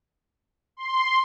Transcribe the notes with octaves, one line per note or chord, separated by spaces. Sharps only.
C6